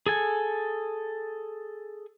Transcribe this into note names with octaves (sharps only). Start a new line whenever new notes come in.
G#4 A4 G#5